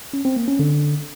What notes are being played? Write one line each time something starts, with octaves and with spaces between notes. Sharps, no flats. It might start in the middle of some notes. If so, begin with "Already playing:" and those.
C#4
C4
A#3
C#4
D3